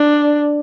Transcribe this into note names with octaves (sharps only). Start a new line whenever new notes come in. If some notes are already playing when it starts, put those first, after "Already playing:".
Already playing: D4